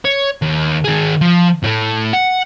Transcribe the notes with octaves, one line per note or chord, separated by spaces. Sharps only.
C#5
D#2
D#3 G#4
F3
A2 A3
F#5